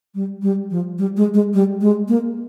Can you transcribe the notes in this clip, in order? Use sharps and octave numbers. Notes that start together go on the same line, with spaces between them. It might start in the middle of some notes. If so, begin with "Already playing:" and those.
G3
G3
F3
G3
G#3
G#3
G3
G#3
A#3